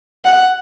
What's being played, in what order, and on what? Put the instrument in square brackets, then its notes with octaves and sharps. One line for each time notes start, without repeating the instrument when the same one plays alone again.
[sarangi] F#5